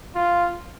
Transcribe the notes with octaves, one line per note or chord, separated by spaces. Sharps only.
F4